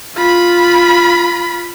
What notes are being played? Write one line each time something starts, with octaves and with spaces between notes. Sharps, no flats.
F4 B5